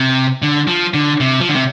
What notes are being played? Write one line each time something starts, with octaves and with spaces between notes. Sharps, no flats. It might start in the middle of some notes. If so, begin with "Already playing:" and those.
Already playing: C3
D3
F3
D3
C3
F3
D3
C3